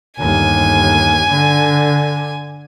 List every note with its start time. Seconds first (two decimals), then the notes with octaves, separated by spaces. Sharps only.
0.19 G1 D#2 G#5
1.30 D3